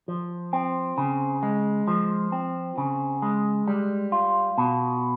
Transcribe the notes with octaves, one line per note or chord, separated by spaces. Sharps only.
F3
C4
C#3
G#3
F3
C4
C#3
G#3
G3
F4
B2